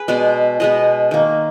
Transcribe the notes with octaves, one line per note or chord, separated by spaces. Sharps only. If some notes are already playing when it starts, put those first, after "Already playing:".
Already playing: G#4 B4
B2 G#3 B3 D5
B2 G#3 B3 D#5
D#3 A#3